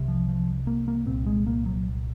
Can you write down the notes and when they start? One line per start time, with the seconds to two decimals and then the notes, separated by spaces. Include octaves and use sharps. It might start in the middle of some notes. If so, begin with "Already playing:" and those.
Already playing: C2 C3
0.08 F3
0.29 F3
0.67 A#3
0.88 A#3
1.06 C2 A#2 C4
1.26 G#3
1.47 A#3
1.66 F#3